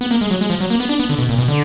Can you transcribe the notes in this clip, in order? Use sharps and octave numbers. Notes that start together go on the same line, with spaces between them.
B3
A#3
G#3
F#3
G#3
F3
F#3
A#3
B3
D4
B3
D3
B2
A#2
B2
D3